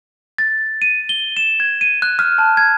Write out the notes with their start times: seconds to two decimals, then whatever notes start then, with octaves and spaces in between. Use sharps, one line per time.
0.38 A6
0.82 D#7
1.09 G7
1.37 E7
1.60 G#6
1.81 D#7
2.02 F#6
2.19 F6
2.38 A5
2.57 G#6